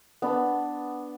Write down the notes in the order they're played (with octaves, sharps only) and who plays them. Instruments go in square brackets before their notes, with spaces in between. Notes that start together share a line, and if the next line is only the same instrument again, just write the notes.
[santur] B3 D4